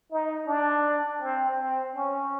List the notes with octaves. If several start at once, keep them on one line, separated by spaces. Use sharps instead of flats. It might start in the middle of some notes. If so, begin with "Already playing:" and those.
D#4
D4
C4
C4
C#4